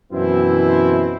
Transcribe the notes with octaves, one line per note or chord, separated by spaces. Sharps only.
F#2 B2 E3 C4 E4